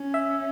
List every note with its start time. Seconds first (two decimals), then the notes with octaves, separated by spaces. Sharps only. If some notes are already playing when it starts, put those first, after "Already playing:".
Already playing: C#4
0.14 E5